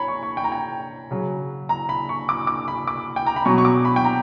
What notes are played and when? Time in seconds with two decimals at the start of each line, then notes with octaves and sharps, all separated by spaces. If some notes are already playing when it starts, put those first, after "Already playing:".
Already playing: C#5 A#5 B5
0.08 C#6
0.23 C#6
0.37 G5
0.44 A#5
0.52 G5
1.11 C#3 F#3
1.69 A#5
1.89 B5
2.09 C#6
2.29 D6
2.47 D6
2.68 B5
2.87 D6
3.16 G5
3.26 A#5
3.36 B5
3.45 B2 F#3 C#6
3.58 C#6
3.65 D6
3.85 B5
3.96 G5
4.04 A#5